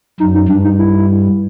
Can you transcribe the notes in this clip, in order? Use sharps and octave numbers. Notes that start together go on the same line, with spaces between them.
F#2 D#4
D#4
G2 D4
D#4
E4